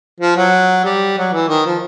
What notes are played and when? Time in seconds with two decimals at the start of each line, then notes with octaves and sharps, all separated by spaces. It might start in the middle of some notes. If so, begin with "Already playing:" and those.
0.20 F3
0.36 F#3
0.85 G3
1.18 F#3
1.33 E3
1.49 D#3
1.66 F3